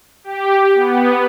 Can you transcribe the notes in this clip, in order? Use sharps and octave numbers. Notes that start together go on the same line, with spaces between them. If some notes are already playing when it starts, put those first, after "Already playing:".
G4
B3